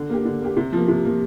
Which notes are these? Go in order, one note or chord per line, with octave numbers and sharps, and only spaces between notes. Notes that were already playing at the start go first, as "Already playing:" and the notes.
Already playing: D3
A#3 G4
D3
A#3 G4
C3
F3 A#3
C3
F3 A#3